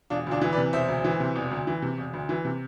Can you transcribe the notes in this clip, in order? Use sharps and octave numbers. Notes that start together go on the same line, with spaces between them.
E1 D4 F4
D2 D4 F4
E3
B4 D5
C3
E1 C5 E5
D2
E3
C3
E1
D2
E3
C3
E1
D2
E3
C3